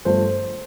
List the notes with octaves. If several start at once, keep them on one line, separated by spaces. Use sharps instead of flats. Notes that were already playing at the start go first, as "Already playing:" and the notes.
G1 G2 F3 A3 C5